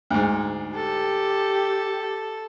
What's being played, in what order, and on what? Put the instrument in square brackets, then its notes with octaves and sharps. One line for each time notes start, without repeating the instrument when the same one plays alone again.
[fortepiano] D2 G#2
[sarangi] G4 [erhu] A4